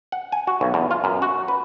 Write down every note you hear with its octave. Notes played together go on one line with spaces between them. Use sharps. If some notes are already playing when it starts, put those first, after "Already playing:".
F#5
G#5
F#4
B1
E2
F4
F#2
F#4
B4